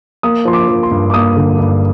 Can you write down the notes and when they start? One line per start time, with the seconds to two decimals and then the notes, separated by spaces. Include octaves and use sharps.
0.23 A#3 D#6
0.45 F3 C6
0.53 D6
0.69 F3
0.83 C6
0.91 G2
1.10 D6
1.14 A#3 D#6
1.36 D3
1.59 G2